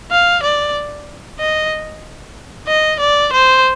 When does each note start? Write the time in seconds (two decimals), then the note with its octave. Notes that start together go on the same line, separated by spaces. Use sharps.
0.11 F5
0.43 D5
1.40 D#5
2.68 D#5
3.00 D5
3.33 C5